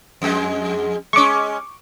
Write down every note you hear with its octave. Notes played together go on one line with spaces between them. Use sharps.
F2 G#3
G#3 C#4 C#6 D6